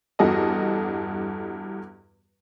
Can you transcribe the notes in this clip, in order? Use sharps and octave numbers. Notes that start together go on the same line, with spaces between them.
E2 G2 F#4 A4 D#5